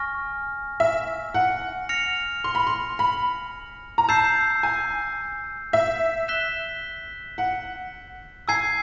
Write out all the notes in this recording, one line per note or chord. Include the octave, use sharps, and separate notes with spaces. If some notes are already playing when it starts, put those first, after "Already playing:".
Already playing: G#5 C#6 F6 A#6
E5
F#5
F6 A#6 C#7 F7
C6
B5
C6
B5
A#5
A5 E6 G6 C7
G#5
E5
F#6 B6 E7 G7
F#5
G#5 E6 G#6 C7